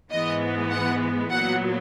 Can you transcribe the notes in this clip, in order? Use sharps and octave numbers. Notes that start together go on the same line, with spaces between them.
G#2 E3 G#3 B3 D#5
F#5
A#2 F#3 B3 F#5